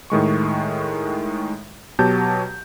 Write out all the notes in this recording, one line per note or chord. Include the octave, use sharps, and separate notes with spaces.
A2 D#3 G#3 C#6
B2 F#3 G4 A5 G6